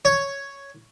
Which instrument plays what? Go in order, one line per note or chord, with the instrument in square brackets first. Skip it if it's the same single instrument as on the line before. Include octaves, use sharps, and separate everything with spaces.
[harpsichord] C#5